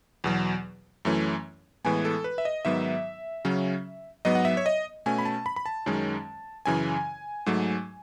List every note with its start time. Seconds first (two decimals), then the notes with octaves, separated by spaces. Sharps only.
0.24 E2 B2 F#3
1.05 F#2 E3 A3 C#4
1.85 A2 E3 G#3 B3 G#5
2.05 A4
2.24 B4
2.38 E5
2.45 D#5
2.65 G#2 D#3 F#3 B3 E5
3.45 C#3 F#3 C#4
4.25 G#2 F#3 B3 D#5
4.35 F#5
4.45 E5
4.57 C#5
4.66 D#5
5.06 B2 A3 C#4 G#5
5.18 B5
5.25 A5
5.46 B5
5.56 B5
5.66 A5
5.86 F#2 D#3 G#3 C#4
6.66 F#2 C#3 E3 G#5
7.46 G#2 F#3 A3